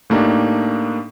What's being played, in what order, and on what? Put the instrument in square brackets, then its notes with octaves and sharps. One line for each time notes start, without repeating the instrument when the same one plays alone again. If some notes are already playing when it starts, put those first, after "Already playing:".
[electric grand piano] A2 A3 A#3 D4 D#4 G4